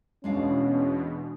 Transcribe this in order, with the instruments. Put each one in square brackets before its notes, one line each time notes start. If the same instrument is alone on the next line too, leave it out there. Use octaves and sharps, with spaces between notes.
[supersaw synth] E2 B2 [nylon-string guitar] G#3 D4 F5 [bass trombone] C#4